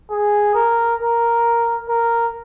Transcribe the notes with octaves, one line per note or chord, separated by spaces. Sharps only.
G#4
A#4
A#4
A#4